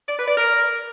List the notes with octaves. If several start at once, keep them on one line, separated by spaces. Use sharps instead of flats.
D5
B4
D5
A#4